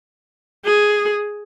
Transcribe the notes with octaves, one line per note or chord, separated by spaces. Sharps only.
G#4